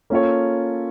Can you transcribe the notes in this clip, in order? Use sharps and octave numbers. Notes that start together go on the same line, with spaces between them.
A#3 C#4 F4 A4 C#5